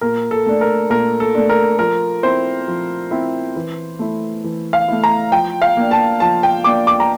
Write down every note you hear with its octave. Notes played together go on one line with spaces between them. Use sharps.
A#2 A#4
A4
A3 D4
A#4
A#2 A#4
A4
A3 D4
A#4
F3 A#4
C4 E4 C5
F3
C4 E4
E3
A3 E4
E3
F5
A3 E4
A#5
F3 G5
F5
A#3 D4
A5
F3 A5
G5
A#3 D4 D6
D6
A#5